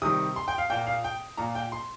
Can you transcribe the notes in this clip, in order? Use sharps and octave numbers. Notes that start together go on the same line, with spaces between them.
C3 D#3 G3 D#6
C6
G5
F5
A#2 A#3 G5
F5
G5
A#2 A#3 A#5
G5
C6